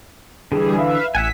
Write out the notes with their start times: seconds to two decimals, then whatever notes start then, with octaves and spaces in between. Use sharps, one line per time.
0.52 D3 E3 G3 G#4
0.77 B4 E5 F5
1.15 A1 E5 F#5 G#5 B6